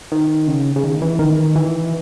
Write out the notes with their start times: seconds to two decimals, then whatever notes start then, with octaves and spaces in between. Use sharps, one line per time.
0.12 D#3
0.48 C#3
0.76 C#3
0.84 D#3
1.02 E3
1.19 D#3
1.55 E3